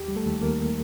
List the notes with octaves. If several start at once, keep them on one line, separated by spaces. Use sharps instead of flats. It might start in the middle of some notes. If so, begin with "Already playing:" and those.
Already playing: D#2 G4
G3
A3 A4
D#2
D#2 A#3 A#4